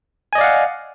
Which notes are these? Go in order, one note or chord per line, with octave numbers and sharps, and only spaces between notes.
D5 D#5 F5 F#5 G#5